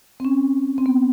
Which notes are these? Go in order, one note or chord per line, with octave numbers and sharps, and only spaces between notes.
C4
C#4
C4
B3